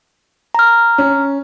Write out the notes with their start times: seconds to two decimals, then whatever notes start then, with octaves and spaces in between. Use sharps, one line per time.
0.55 A#5 F6
0.98 C#4